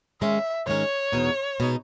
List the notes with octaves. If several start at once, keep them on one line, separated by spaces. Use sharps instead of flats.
G#2 D#3 G#3 C#4 E5
G#2 D#3 G#3 C#4 C#5
E2 B2 G#3 D#4
B2 G#3 D#4